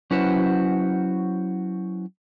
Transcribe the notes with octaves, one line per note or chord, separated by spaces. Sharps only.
F#3 C#4 E4 F#4 B4 C5